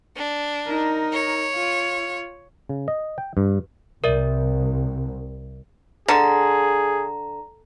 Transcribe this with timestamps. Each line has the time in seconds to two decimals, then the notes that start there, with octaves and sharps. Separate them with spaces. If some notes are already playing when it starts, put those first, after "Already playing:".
0.16 D4
0.68 D#4 A#4
1.13 C#5
1.56 F4
2.69 C#3
2.88 D#5
3.18 G5
3.37 G2
4.04 C2 A#4 D5 E5
6.08 D3 G#4 A#5